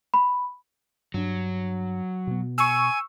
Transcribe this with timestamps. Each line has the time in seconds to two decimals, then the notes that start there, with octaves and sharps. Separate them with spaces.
0.14 B5
1.14 G2 F#3 D4
2.27 B2 B3
2.58 G#5 C#6 E6